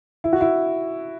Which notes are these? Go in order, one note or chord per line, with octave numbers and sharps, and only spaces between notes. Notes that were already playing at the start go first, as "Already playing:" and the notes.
E4
F#4
E4